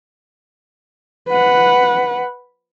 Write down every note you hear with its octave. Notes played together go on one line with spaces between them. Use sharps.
B4 F#5